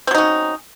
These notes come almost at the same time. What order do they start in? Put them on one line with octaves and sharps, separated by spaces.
C4 F#3 D#4 C#4